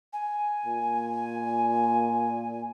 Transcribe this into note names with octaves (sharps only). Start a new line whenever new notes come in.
G#5
A#2